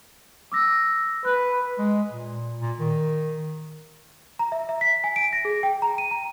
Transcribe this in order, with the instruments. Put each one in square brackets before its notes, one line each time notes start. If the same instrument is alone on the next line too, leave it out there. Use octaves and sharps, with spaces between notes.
[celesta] D6 E6 A#6
[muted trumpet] B4 [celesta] F#6
[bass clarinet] G#3
A#2
A#2
D#3
[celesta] A#5
E5
E5
B6
G#5
D7
A#6
G#4
G5
A#5
D#7
A#5